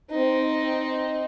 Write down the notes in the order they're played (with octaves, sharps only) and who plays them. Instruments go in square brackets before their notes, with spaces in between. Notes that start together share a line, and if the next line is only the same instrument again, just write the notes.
[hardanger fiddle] C4 D#4